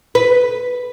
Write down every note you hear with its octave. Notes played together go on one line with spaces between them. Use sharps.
B4